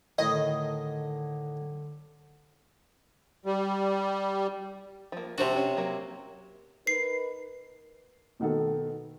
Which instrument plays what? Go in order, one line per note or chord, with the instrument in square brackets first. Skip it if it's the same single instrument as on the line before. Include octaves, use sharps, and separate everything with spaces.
[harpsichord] A2 D#3 [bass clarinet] D3 [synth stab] D#5
[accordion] G3
[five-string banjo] F3 A#3
[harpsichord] C3 F#4 [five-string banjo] D4 C5 A5
[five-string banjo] C#4
F#3 A#3
[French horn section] D#4 A#4 B4 [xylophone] C7
[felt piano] B2 D#3 B3 A4